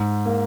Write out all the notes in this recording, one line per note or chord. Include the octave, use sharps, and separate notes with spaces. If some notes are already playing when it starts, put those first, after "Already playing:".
Already playing: G#2
A#3